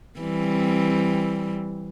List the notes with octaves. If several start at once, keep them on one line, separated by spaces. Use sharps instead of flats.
E3 G3 C4